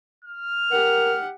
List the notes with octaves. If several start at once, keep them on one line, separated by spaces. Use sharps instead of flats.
F6
G4 A#4 F#5